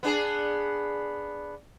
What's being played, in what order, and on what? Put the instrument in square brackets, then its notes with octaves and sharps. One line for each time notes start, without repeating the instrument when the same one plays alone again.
[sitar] B3 D4 G#4